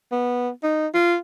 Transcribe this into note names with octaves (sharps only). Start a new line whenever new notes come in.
B3
D#4
F4